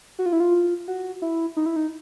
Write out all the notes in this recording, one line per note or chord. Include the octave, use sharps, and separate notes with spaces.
F#4
F4
E4
F4
F#4
E4
D#4
E4
D#4